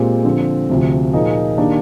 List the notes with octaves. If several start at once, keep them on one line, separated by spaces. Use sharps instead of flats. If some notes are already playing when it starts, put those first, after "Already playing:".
Already playing: A#2 G#3 C4 G4
D3 F3 C4
D2 C3 F3
A#2 F3 A#3 D#4 G#4
D#3 A#3 D4 G4